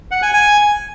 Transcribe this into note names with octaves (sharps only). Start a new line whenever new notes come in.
F#5
G#5
G#5